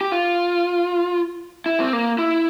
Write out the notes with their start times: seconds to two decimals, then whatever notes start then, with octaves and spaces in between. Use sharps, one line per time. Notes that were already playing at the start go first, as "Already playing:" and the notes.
0.01 G4
0.12 F4
1.66 E4
1.80 C4
1.93 A#3
2.18 E4